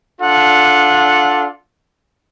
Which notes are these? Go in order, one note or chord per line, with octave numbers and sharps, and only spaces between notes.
D4 F4 A4 F#5